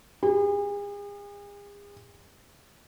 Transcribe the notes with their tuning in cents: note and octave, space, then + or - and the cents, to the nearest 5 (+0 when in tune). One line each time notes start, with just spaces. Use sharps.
G#4 -40